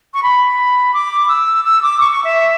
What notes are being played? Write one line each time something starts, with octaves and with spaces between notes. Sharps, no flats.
C#6
B5
D6
E6
E6
D6
C#6
C#6
E5